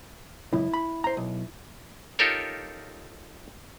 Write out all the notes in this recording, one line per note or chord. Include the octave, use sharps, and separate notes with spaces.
C#2 F#2 E4
B5
C5 A#5
B1
D#4 F4 G4 A4 A#4 C#5